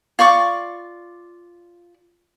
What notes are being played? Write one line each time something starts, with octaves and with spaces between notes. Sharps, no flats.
F4 D5 C#6 D6